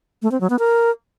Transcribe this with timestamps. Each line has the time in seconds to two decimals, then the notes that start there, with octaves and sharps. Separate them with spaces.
0.22 A3
0.31 C4
0.41 F#3
0.50 B3
0.59 A#4